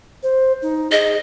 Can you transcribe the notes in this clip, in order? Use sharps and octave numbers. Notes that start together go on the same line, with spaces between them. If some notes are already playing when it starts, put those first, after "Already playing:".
C5
D#4
G#4 D#5